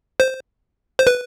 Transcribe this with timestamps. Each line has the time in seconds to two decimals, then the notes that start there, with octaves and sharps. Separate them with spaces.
0.20 C5
0.99 C5
1.07 B4